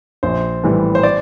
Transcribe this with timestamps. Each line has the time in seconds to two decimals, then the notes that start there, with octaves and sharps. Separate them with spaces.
0.23 A#1 C5
0.64 A2 E3 G3
0.95 C5
1.03 D5